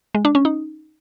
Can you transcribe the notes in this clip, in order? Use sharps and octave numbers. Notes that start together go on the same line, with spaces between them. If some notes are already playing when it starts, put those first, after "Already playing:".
G#3
D4
C#4
D#4